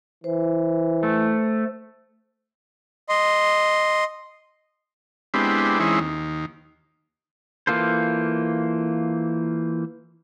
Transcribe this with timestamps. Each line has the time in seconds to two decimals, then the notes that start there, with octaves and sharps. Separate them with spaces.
0.24 E3 C5
1.03 A3
3.09 D#5 C6
5.34 G#3 B3 C4 D4 E4 G4
5.80 E3 G#3 C4 C#4 D#4 E4
6.00 D#2
7.67 E3 A#3 F4 A4 C5